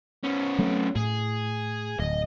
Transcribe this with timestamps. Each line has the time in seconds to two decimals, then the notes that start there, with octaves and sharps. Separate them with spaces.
0.23 B3 C#4
0.59 F#3 A3 C4
0.96 A2 G#4
1.99 D1 D#5